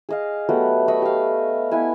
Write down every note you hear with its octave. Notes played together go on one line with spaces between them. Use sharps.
G#4 D#5 F5
F#3 A3 B3 G4
D#5 E5 B5 C#6
G4 F5
B3 E4 G#5